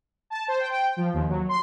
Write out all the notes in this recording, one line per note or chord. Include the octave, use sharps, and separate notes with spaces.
A5
C5
G5
G5
F3
D#2
F#3
C6